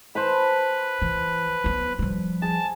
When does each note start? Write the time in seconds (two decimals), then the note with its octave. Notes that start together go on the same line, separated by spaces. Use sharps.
0.15 B4 C5 A5 B5
1.02 E3
1.64 F#3 B3
1.99 F3 G3
2.42 G#4 A5